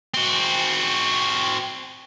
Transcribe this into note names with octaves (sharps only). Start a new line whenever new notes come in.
C4 F#4